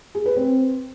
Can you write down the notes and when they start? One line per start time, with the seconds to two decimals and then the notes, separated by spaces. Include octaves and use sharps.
0.15 G#4
0.26 B4
0.36 C4